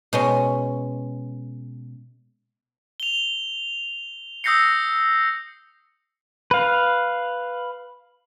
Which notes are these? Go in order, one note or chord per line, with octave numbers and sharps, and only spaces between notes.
B2 G#3 C#4
F7 G7
D#6 E6 G6 A#6 C7 C#7
B4 F5